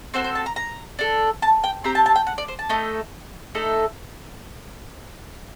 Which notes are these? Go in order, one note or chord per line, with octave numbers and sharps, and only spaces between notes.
C4 F#4 A4 C5
C5
A5
A#5
A#5
D4 A4
A5
G5
C4 G4 A#5
A5
A5
G5
F#5
D5
C5
A5
A3 D#4 A4
A3 D#4 A4